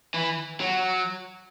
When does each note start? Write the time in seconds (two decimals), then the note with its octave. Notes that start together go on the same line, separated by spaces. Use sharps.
0.14 E3
0.60 F#3